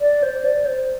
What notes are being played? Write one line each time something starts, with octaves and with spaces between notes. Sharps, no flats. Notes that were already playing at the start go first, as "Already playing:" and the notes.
D5
C5
D5
C5